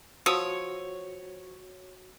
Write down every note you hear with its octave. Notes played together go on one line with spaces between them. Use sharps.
F3 F#4 C#5 D#6 E6 D#7